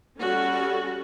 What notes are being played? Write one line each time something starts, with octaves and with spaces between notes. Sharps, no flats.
G3 C#4 F#4 A4